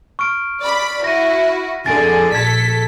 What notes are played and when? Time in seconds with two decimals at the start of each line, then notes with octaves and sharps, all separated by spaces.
0.19 C#6 F6 D7
0.60 D5 B5
1.04 E4 F#4 A#6 D#7
1.86 F2 D3 G#4 A6 D7
2.35 A#1 A4 G#6 B6